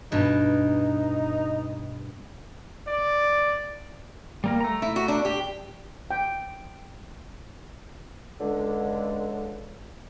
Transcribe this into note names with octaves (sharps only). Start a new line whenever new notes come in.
G2 B2 D#4
D5
G3 A#3 A#4
A3 A#5
E4
F#4
D4
G4
G5
C#2 D3 G#3